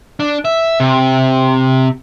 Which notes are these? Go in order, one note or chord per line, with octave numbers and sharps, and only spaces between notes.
D4
E5
C3